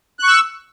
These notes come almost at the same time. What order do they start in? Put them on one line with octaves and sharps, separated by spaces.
F#6 C#6 E6